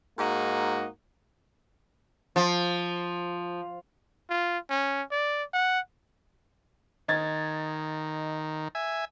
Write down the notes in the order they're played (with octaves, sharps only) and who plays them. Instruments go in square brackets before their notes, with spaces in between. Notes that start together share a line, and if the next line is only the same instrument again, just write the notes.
[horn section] G#2 A#3 D#4 F#4
[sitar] F3
[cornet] F4
C#4
D5
F#5
[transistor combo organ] D#3 [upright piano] D#5 G#6 A6
[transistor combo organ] E5 G#5